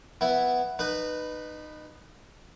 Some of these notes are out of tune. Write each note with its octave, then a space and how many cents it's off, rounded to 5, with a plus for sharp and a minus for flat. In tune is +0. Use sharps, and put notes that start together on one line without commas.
B3 +0 E4 +0
D#4 -25 B4 +0